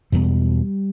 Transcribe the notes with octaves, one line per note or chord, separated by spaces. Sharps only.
E2 B2 G3